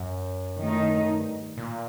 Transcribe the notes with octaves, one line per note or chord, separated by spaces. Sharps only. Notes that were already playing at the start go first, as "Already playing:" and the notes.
Already playing: F#2
D#3 A3 D#4
G2
A#2